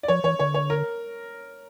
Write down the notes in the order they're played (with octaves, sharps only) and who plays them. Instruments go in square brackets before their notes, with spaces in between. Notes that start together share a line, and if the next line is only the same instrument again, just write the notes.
[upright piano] D5
[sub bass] F3 [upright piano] C#5
[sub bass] E3 [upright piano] C#5
[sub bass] D3 [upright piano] C#5
[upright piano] C#5
A#4